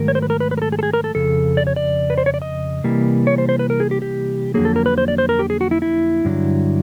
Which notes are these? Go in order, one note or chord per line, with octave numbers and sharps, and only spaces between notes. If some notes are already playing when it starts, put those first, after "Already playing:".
Already playing: G#2 D#3 F#3 A3 A#4
C#5
C5
B4
A#4
B4
B4
A#4
A4
G#4
A4
G#4
A#4
A4
F2 C#3 A4
D5
C#5
D5
B4
C5
C#5
D5
D#5
C3 E3 G3 A#3
C#5
C5
C5
B4
A#4
G#4
G4
G4
F2 D3 F#3 A#3 G#4
A4
A#4
B4
C5
D5
C5
A#4
G4
G#4
F#4
E4
E4
G2 D3 F#3